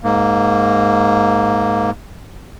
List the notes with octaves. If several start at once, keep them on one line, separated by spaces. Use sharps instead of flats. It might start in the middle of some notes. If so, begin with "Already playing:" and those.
G#2 A#3